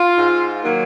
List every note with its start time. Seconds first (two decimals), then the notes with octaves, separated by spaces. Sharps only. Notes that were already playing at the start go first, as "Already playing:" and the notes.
Already playing: F4
0.16 G#2
0.63 D#3 F#3 A#3